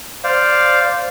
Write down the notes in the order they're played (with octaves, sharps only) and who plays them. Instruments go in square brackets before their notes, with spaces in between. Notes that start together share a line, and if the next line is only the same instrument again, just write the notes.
[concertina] C5 D5 F5